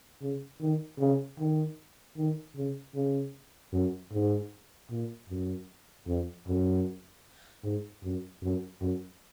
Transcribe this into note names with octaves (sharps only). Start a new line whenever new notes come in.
C#3
D#3
C#3
D#3
D#3
C#3
C#3
F#2
G#2
A#2
F#2
F2
F#2
G#2
F#2
F#2
F#2